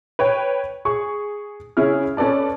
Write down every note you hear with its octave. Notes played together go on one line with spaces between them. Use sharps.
B4 C#5 G5
G#4 C#6
C#3 C#4 E4 G#4 F6
C#4 A4 B4 D5 A5